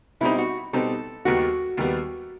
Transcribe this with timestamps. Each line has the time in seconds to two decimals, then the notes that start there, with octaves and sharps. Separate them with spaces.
0.21 B2 G3 C4 D#4 E4
0.38 F#4
0.73 B2 G3 C4 D#4 A4
1.25 D#2 D#3 G3 B3 F#4
1.77 D#2 D#3 G3 B3